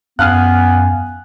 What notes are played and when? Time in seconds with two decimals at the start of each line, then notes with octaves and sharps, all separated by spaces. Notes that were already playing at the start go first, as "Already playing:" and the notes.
0.19 F#2 B3 F5 G#5 F6 F#6